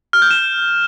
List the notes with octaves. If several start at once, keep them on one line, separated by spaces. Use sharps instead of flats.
F6
G6
E7